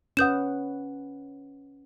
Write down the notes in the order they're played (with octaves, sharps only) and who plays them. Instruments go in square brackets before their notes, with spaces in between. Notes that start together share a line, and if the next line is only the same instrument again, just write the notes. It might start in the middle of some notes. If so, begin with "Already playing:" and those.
[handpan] C#4 B4 F#5 [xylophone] D#6 G6 E7